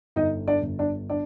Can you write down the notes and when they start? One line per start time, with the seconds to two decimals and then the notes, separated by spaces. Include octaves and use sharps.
0.16 G1 D#4 D#5
0.48 D4 D5
0.63 G1
0.79 D4 D5
1.10 D4 D5